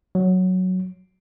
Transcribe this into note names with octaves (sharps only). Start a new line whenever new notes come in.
F#3